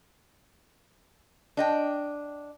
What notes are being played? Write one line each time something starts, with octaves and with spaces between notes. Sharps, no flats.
D4 D#5 G5